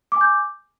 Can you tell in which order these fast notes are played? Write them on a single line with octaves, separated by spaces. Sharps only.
D6 G#5 G6